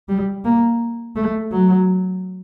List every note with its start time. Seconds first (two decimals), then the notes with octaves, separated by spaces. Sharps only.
0.09 G3
0.45 A#3
1.16 A3
1.52 F#3